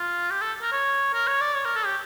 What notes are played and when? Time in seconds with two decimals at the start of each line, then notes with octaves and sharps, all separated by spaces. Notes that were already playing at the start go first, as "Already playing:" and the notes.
Already playing: F4
0.31 G4
0.41 A4
0.62 A#4
0.72 C#5
1.14 A#4
1.28 C#5
1.41 D5
1.55 C#5
1.66 A#4
1.76 A4
1.86 G4